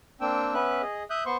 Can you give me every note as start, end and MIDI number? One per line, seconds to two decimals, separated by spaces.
0.21 0.54 58
0.21 0.54 60
0.21 0.54 62
0.21 0.54 79
0.21 0.54 88
0.54 0.82 59
0.54 0.82 61
0.54 0.82 71
0.54 0.82 76
0.54 0.82 90
0.82 1.03 68
0.82 1.03 75
1.10 1.24 76
1.10 1.24 87
1.10 1.24 90
1.10 1.24 91
1.26 1.37 59
1.26 1.37 72
1.26 1.37 84
1.26 1.37 85